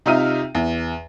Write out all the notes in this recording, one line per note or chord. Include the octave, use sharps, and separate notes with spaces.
C3 D#4 F4 E5 F6 D#7
E2